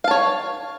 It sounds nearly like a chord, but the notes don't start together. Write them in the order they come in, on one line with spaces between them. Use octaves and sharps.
F5 A5 C#5